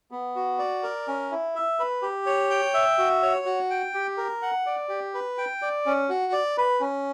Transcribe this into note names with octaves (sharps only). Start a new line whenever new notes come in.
B3
F#4
D5
A#4
C#4
E4
E5
B4
G4
C#5
G5
E5
F#4
C#5
F#4
G5
G4
A#4
F#5
D5
G4
B4
G5
D5
C#4
F#4
D5
B4
C#4